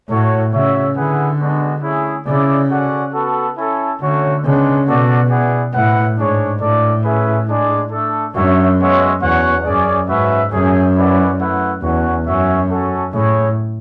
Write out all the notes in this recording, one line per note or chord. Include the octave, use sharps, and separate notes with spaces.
A2 F#4 A4 C#5
C#3 F#4 C#5 E5
D3 E4 G#4 B4 F#5
G#3 B3 D4 F#4
A3 C#4 E4 G#4
C#3 E4 G#4 D5
C#4 F#4 A4 D5 F#5
B3 F#4 A4
C#4 E4 A4
D3 A3 C#4 F#4 C#5
C#3 G#3 B3 D4
B2 F#4 A4 D5 F#5
B3 E4 G#4 D5 F#5
A2 E4 B4 F#5
G#2 D4 G#4 C#5
A2 D4 A4 D5
C#4 G#4 B4 E5
G#3 D4 G#4 D5
A3 D4 A4
F#2 D4 F#4 C#5 E5
G#3 B3 F#4 C#5 E5
E2 C#4 F#4 C#5 F#5
F#2 C#4 G#4 D5
G#2 C#4 F#4 B4 E5
F#2 A3 C#4 G#4
C#4 E4 B4 D5 F#5
A3 E4 B4 F#5
E2 C#4 F#4 C#5 F#5
F#2 C#4 F#4 C#5 E5
C#4 F#4 A4
A2 E4 G#4 C#5